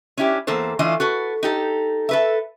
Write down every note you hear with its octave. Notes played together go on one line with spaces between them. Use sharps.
C#4 D4 E4 F#4 G4
E2 A#3 A4 C5
E3 A3 D4 F4 D#5
F#4 A4 B4
D#4 G4 A4
A4 B4 E5